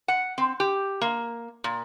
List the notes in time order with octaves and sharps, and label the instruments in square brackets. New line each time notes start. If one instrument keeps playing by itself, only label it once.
[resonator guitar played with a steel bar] F#5
C4
G4
A#3
A#2